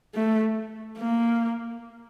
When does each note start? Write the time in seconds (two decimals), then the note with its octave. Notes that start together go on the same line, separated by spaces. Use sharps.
0.14 A3
0.98 A#3